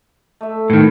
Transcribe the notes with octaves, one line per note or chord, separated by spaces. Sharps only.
A3 E5
A2 D#3 B3